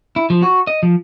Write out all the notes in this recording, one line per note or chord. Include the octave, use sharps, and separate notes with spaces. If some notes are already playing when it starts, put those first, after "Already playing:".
E4
F3
F#4
D#5
F3